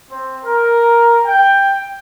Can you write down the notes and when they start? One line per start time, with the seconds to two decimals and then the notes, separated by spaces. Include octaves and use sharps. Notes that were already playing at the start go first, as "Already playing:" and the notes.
0.11 C4
0.44 A#4
1.25 G5